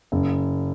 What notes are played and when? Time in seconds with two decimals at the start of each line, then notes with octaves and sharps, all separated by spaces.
0.12 F#1